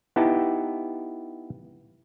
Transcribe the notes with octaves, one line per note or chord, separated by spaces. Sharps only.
B3 D#4 E4 G4 A5